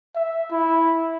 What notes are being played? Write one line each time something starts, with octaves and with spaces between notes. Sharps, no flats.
E5
E4